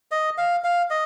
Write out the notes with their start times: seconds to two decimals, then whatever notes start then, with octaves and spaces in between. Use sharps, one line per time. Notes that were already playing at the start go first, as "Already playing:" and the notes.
0.11 D#5
0.38 F5
0.64 F5
0.90 D#5